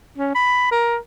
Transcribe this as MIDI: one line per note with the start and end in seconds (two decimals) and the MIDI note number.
0.18 0.34 61
0.35 0.68 83
0.72 0.97 70